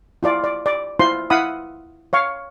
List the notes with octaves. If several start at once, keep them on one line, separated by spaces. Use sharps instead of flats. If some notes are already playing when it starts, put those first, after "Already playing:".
E4 F4 D5
D5
D5
E4 F4 C5 C6
E4 F5 F#5 B5 D#6
C#5 F5 C#6